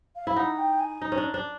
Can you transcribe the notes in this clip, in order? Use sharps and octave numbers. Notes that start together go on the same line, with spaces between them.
F5
E4 F5
D#4 F#5
G5
G#5
D#4
C#4
D4
D4